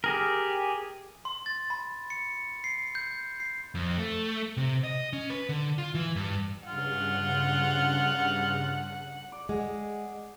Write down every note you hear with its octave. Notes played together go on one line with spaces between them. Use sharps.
G4 G#4 A#4
C6
A6
B5
C#7
C7
G6
C7
F2
A3
C3
D#5
C#4
B4
D3
F4
E3
G2
G2 C#3 F4 F#5
D5
G#3 G#4 F#5